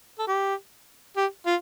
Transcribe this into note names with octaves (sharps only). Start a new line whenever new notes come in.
A4
G4
G4
F4